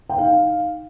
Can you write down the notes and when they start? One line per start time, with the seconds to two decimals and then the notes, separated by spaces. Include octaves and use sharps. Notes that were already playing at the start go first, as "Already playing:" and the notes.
0.09 G5
0.18 D#4 F5